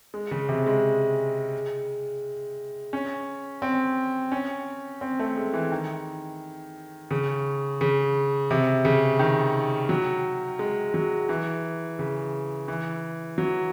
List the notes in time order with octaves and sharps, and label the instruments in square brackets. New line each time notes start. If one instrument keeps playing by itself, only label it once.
[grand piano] G#3
C#3
C3
G#3
C#4
C4
C#4
C4
A3
G#3
E3
D#3
C#3
C#3
C3
C#3
D#3
F#3
G#3
F#3
E3
C#3
E3
F#3